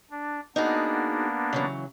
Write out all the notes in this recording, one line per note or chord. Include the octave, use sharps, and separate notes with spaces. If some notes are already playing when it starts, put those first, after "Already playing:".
D4
A#3 B3 D4 D#4 F#4 G#4
C#3 E3 F#3